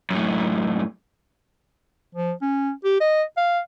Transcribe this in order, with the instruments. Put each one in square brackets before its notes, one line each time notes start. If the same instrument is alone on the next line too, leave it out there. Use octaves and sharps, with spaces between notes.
[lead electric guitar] F#2 A2
[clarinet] F3
C#4
G4
D#5
F5